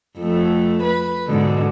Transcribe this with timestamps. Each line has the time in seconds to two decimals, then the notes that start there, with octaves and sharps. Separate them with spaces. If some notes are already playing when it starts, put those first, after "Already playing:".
0.19 F2 A3
0.83 B4
1.27 G#2 B2 D3